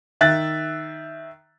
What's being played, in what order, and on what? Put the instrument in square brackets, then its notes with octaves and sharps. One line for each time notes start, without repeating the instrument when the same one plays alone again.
[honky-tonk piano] D#3 E5 F#6 A6